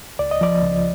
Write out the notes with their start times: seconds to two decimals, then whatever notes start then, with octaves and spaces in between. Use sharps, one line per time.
0.19 C#2 D5
0.31 D#5
0.41 F3 D5
0.63 C#2